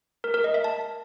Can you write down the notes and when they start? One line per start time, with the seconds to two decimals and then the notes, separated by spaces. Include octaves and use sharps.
0.24 A#4
0.34 A#4
0.44 D#5
0.54 E5
0.64 A5